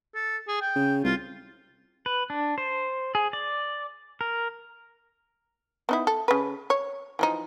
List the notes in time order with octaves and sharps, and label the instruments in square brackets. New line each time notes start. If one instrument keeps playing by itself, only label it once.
[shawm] A4
G#4
G5
[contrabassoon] C#3
[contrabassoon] C2 [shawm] F4
[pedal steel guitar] B4
D4
C5
G#4
D5
A#4
[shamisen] B3 D#4 E4
A4
C#3 B4
C#5
E3 F3 D#4